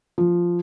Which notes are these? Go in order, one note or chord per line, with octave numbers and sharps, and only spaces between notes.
F3